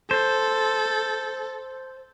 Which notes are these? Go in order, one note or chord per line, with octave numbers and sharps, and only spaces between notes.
A4 C5